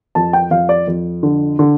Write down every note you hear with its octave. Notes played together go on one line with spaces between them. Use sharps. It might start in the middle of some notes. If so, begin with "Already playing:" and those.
F2 A5
G5
F2 F5
D5
F2
D3
D3